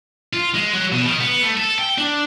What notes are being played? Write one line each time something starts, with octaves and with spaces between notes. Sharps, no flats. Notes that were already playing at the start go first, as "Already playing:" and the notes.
F4
G#3
F#3
B2
D#3
B3
A3
A4
G5
D4